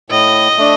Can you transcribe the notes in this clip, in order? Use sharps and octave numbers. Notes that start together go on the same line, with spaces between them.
A2 D#5
A3 D4